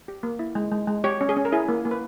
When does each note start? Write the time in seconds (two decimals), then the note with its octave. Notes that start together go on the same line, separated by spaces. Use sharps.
0.08 G4
0.23 A#3
0.39 E4
0.55 G#3
0.71 G#3
0.88 G#3
1.04 G4 C#5
1.21 C#4
1.29 G#4
1.36 C#4
1.45 A#4
1.52 E4 G#4
1.69 A#3
1.85 A#3
1.91 B4